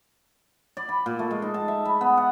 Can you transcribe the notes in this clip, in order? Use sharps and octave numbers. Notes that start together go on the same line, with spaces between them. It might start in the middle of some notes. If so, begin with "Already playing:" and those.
D5
B5
A#2
A3
G#3
D#4
A5
E5
B5
B3
F#5